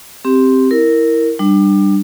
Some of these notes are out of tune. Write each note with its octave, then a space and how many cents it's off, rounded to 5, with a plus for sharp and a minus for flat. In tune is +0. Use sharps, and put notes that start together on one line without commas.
C4 +0 G4 +0
E4 -5 A#4 -10
G3 +0 D4 +25